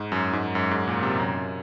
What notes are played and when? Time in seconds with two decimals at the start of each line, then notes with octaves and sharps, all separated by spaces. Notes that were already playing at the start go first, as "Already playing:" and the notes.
Already playing: G#2
0.12 F#2
0.33 G#2
0.55 F#2
0.71 G#2
0.88 A#2
1.03 C3
1.20 F#2